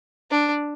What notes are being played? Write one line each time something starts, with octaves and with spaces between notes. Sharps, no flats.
D4